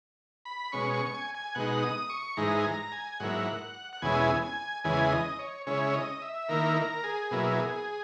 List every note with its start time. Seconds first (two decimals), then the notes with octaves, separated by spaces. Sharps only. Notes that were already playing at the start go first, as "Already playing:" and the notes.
0.45 B5
0.72 B2 G#3 C#4 C#6
0.94 C#6
1.14 G#5
1.35 G#5
1.55 B2 G#3 D#4 F#5
1.83 D#6
2.10 C#6
2.37 G#2 E3 G#3 D#4 A#5
2.60 G#5
2.65 A#5
2.92 G#5
3.20 G#2 F#3 A#3 E4 F#5
3.93 F#5
4.02 E2 B2 G#3 C#4 E4 G#5
4.43 G#5
4.84 E2 C#3 E3 G#3 G#5
5.12 D#5
5.39 C#5
5.67 C#3 G#3 C#4 E4 C#5
5.94 D#5
6.22 E5
6.49 D#3 A#3 E4 A#4
6.77 A#4
7.04 G#4
7.31 B2 F#3 A#3 E4